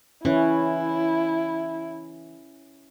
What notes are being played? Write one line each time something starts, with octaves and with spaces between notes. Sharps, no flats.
E3 C#4 E4